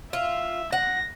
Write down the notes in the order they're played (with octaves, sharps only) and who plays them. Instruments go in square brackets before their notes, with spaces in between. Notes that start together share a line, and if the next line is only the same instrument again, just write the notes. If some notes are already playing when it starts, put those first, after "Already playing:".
[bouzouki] F4 [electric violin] E5
[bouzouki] F#5 [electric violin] A#6